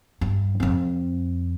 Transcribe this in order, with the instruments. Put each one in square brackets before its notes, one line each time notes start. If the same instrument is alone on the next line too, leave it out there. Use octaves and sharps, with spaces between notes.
[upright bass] G2
F2 C4